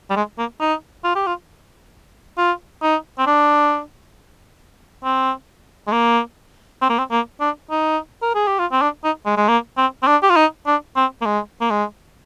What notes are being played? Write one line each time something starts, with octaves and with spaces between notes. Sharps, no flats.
G3
G#3
A#3
D#4
F4
G4
F4
F4
D#4
C4
D4
C4
G#3
A#3
C4
A#3
C4
A#3
D4
D#4
A#4
G#4
G4
F4
C4
D4
D#4
G#3
G#3
A#3
C4
C4
D4
G4
F4
D#4
D4
C4
A#3
G#3
A#3
G#3